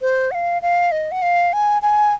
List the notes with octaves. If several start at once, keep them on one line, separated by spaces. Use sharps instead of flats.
C5
F#5
F5
F5
D#5
F#5
F5
G#5
G#5